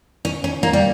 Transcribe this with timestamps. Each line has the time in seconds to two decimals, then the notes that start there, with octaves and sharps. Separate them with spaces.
0.25 C#4
0.44 C#4
0.63 A#3
0.73 G3